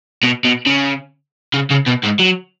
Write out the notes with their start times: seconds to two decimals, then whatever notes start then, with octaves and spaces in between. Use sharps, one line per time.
0.23 B2
0.44 B2
0.66 C#3
1.54 C#3
1.71 C#3
1.87 B2
2.04 G#2
2.20 F#3